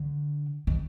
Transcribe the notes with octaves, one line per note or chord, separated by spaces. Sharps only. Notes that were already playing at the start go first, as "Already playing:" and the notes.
Already playing: D3
D#3